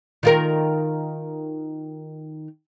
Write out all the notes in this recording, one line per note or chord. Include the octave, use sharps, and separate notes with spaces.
D#3 F4 A#4